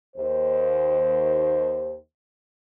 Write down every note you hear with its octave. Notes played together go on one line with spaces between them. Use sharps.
D#2 C5